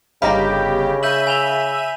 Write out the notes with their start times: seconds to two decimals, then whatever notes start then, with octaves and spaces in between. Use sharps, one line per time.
0.22 G1 C#3 A#3 D#4 G4 F5 B5 A#6
1.03 E5 G6 D#7 F#7
1.27 G#5 F7 G7